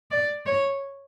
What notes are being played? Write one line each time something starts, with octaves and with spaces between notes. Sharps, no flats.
D5
C#5